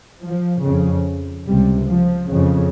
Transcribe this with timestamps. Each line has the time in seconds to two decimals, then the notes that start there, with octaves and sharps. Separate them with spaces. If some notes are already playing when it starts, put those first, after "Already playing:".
0.22 F3
0.64 F2 C#3
1.47 C#2 C3 G3
1.88 F3
2.30 F2 C#3